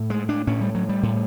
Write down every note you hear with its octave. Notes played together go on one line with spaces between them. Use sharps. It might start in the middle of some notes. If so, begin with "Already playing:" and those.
Already playing: A2
G#3
D4
A2 C#4
G3
F#3
G3
A2